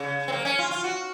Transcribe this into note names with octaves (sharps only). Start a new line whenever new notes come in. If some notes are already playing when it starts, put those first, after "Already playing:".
Already playing: C#3
C4
A#3
C#4
F4
F4
F#4